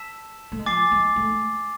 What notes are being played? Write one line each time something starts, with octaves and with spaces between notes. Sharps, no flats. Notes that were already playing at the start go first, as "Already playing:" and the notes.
Already playing: A5 E6 B6 E7
A3
G#3
F3 G#5 D6 A6 C7
G#3
A3